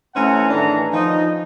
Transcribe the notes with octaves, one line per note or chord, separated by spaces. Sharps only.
E3 A3 C4 C#4 F#5 A#5
A2 D#3 E3 D4 G#4 A#5
F3 D#4 D#5